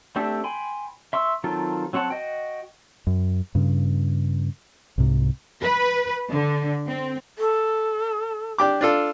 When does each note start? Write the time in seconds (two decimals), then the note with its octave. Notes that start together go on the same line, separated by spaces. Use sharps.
0.16 A3 C4 D4 G4 A4
0.44 G5 G#5 B5 C6
1.13 E5 C6 C#6 E6
1.44 D#3 F#3 C4 F4 A4
1.93 F#3 C4 C#5 F#5 A5
2.10 F#4 D#5 G5
3.07 F#2
3.55 G2 C#3
4.98 C2 G#2 C3
5.63 B4
6.31 D3
6.88 C4
7.38 A4
8.58 D4 G4 D6
8.81 D4 F4 A4